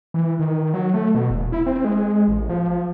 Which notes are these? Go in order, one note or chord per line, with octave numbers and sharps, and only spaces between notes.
E3
D#3
F#3
A3
B2
E1
E4
C4
G#3
A1
F3